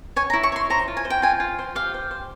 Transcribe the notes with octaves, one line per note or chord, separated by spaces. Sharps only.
C#5 G#5
A#5
E4
C#6
C#5 C6
C5 A#5
F4
G#5
C5
G5
F4 G#5
F4
C5
G4 F5
C5
C5